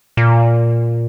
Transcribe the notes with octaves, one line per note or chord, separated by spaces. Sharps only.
A#2